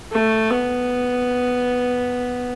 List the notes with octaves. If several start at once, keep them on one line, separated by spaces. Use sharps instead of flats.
A3
B3